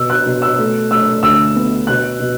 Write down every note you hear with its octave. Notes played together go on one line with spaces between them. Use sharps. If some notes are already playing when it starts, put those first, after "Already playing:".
Already playing: B2 E6
F#6
B2
E6
A3
A3 E6
D2 E6
B3
B2 F#6
B2